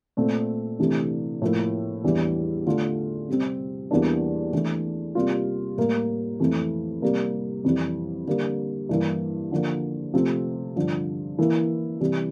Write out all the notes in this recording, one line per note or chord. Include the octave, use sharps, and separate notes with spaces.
A#2 A3 C4
C3 E3 A3 D4
A2 F3 A#3 E4
E2 E3 G3 D4
D3 A3 D4 F4
C3 G3 C4
E2 E3 G3 A#3 D4
E3 A3 D4
C3 G3 A#3 F4
A2 G3 A#3
F2 E3 A3
C3 G3 A#3
F2 E3 G3
D3 G3 A#3
G2 E3 A#3 E4
D3 F3 A#3
C3 F3 A3 C4
G2 D3 F3
E3 A#3 E4
C3 E3 G3